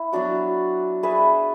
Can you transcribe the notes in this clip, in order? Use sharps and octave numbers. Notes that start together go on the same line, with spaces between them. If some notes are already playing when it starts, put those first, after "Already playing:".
Already playing: E4
F#3 B3 D4 F#4
D4 G#4 B4 E5